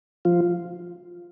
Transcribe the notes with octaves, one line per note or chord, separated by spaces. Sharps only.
F3 F4